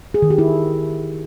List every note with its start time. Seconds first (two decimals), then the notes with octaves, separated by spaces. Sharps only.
0.14 G#4
0.22 D#3
0.30 G4
0.38 E4